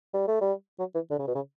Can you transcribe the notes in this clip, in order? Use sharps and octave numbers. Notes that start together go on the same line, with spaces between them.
G3
A3
G3
F#3
E3
D3
C#3
B2
C#3